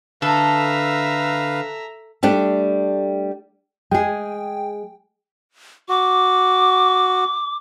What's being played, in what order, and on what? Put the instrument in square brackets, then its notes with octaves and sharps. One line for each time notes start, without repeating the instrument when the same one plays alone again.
[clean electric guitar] D3 [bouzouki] A4 [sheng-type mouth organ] B4 F5 [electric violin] E5 A#5
[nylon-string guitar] G3 A3 D4 G4
[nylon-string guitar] G#3 G#4 [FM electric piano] G5
[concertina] F#4 [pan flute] D6